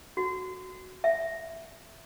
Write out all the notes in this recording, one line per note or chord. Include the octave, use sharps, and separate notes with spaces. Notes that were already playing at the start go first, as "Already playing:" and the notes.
F#4
E5